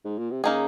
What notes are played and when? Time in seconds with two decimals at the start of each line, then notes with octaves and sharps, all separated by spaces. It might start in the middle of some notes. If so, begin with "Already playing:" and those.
0.05 G#2
0.18 A#2
0.31 C3
0.44 C#3 A#3 D#4 G#4